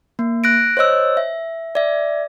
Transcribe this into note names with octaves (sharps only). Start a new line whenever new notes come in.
A#3
F#6 A#6 D7
C5 C#5 D#5 E6
E5
D5 E5